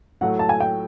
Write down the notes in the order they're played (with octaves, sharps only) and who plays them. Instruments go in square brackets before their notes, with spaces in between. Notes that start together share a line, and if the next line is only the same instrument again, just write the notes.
[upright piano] A2 F#3 A3 [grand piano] F#5
[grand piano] A5
G#5
G5